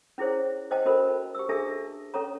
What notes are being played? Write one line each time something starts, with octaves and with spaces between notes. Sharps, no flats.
C#4 E4 G#4 C5 C#5
C5 D#5 G5 A5
C#4 F#4 A4 A#4 C5 B5
G4 E6
D4 G#4 A4 E5 A5
C#4 A4 C#5 A#5